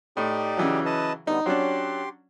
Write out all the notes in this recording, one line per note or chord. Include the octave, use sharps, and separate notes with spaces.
A2 D#4 G4 D5
C#3 E3 F#3
B4 D#5 A5
D3 G3 B3 D#4
F#3 C#4 D4 G4 C6